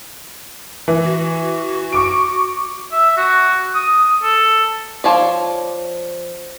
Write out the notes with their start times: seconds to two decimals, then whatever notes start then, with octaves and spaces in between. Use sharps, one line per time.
0.88 E3
1.04 F#4
1.92 C#6 D6 D7
2.92 E5
3.17 F#4
3.75 D#6
4.23 A4
5.04 F3 C#5 D5